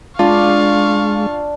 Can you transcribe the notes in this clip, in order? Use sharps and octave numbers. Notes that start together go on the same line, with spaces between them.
G#3 D4 F4 F5 C#6